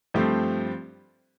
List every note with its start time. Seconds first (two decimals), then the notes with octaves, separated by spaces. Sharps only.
0.14 G2 F3 A3 C4 G4